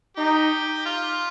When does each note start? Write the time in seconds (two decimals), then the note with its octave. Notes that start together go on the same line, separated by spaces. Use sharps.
0.17 D#4 G4
0.85 F4